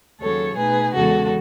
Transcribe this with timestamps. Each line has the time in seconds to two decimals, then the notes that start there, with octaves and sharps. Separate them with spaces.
0.19 D#2 C#3 F#3 A4 C#5
0.56 B2 A3 D#4 G#4 B4
0.93 E2 C#3 E3 G#3 B3 F#4 A4